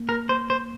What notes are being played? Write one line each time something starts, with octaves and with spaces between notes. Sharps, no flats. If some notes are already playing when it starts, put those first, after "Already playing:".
Already playing: A#3
A#4
C5
C5